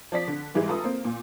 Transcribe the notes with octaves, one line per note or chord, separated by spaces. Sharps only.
F3 D5 B6
D3
G#2 E3 G3 G#3
F4 A4 B4 A#5 D#6
A#3 C4
A#2